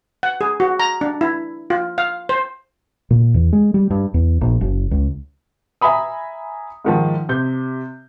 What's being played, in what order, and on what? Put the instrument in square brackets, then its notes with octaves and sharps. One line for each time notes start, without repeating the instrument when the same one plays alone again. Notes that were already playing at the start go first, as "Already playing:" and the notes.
[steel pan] F#5
G#4
F#4
A#5
D4
E4
F4
F5
C5
[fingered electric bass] A#2
E2
G#3
G3
G2
E2
A#1
F#1
C#2
[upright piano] E5 G#5 A#5 B5 D#6
G#2 D#3 F3
C3 G6